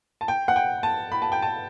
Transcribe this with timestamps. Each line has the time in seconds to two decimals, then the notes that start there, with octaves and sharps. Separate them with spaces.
0.21 A5
0.28 G5
0.48 F#5
0.56 G5
0.83 A5
1.12 B5
1.22 A5
1.32 G5
1.42 A5